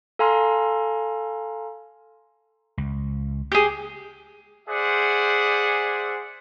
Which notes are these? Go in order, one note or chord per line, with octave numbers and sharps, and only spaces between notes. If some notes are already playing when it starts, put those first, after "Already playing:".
A4 F5 G#5 A#5 C6 F6
C#2
G4 G#4
G#4 C5 D5 E5 F#5